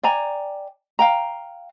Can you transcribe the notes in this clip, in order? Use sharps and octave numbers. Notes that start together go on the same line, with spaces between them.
D5 G5 G#5 A#5
F5 G5 A#5